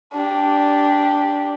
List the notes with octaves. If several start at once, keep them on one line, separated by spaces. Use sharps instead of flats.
D4 G4